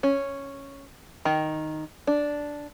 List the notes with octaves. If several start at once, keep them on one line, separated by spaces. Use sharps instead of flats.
C#4
D#3
D4